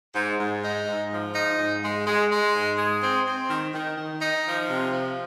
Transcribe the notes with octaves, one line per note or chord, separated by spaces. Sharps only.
G#2
G#2
D#4
G#2
F3
D#4
G#2
G#3
G#3
G#3
G#2
G#3
C4
C4
D#3
D#3
D#3
D#4
F3
C3
F3